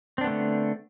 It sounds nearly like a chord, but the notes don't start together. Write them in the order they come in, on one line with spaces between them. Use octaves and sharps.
C4 D4 B3 A3 D3